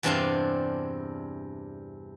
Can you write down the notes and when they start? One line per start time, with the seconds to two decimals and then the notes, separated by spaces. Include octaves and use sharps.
0.03 E2 G2 C3 C4 D4 F5